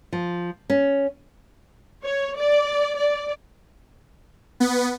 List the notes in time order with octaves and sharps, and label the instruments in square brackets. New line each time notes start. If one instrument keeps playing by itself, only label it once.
[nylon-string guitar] F3
C#4
[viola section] C#5
D5
D5
[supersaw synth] B3